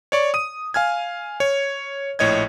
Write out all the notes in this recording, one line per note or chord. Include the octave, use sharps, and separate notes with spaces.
C#5 D5 C#6
D#6 D#7
F5 G#5 F6 G#6
C#5
A#1 A2 C#5 D#5 G#6